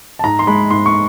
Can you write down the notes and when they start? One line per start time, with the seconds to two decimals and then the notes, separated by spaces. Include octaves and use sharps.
0.19 A5
0.24 G#2 A#5
0.39 C6
0.47 G#3 B5
0.70 G#2 C6
0.86 C#6